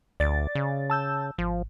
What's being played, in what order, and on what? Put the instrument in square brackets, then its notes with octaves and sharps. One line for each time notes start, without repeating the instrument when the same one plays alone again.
[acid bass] D2 [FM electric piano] D5 A6
[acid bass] C#3
[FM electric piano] A5 E6 G6
[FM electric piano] G#1 [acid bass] F3